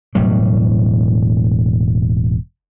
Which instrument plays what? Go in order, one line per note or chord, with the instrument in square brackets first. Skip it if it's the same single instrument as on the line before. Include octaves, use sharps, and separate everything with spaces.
[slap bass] E1 A2 F#3 G3